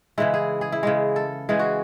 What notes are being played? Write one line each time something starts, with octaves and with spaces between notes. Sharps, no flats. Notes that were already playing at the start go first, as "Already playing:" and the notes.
C#3 E3 G#3 E4
G#4
G#4
E4
C#3 E3 G#3
A4
C#3 E3 G#3 G#4
F#4